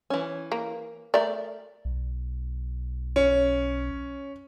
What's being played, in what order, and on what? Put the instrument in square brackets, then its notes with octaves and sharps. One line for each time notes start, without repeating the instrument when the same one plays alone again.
[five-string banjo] E3 C#4
[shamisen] A#3
[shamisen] A3 A#4 [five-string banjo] D5
[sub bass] B1
[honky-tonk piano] C#4